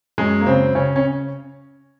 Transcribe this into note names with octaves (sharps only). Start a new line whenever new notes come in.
F#2 G#3
A#3
C#3 C4
C#3 C#4
C#4